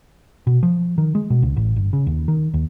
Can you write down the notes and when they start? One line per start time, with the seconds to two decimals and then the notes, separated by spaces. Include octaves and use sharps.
0.47 B2
0.63 F3
0.98 D#3
1.15 G#3
1.30 B2
1.42 C#2
1.57 A1
1.76 G1
1.93 C#3
2.07 D#2
2.28 D#3
2.54 D#2